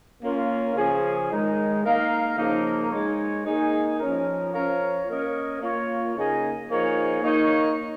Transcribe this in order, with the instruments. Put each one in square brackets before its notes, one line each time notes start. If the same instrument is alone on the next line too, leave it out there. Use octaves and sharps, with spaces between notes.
[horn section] A#3 C#4 F4
C#3 F3 C#4 G#4
D#3 G#3 D#4
A#3 D#4 A#4 F5
C#3 F3 A#3 D#4 A#4
G#2 G#3 D#4 C#5
A#3 D#4 G#4
F3 C#4 A#4
F3 C#4 A#4 C#5 F5
A#3 C#4 A#4 D#5
A#3 F4 C#5
C#3 A#3 D#4 G#4 D#5
F3 A#3 D#4 G#4 C#5
A#3 D#4 C#5